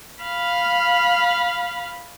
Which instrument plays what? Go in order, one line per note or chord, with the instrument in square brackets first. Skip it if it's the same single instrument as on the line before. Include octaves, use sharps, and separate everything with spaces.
[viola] F5 B5